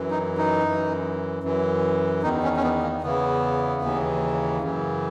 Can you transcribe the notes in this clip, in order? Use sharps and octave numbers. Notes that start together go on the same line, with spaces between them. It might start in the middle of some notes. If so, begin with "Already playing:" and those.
Already playing: F#2 E3
D#4
D#4
F#2 E3
F#2 E3
E2 D#3 D#4
C#4
C#4
B3
A#3
E2 C#3 E3 B3
D#2 C#3 E3
F#2 C#3 E3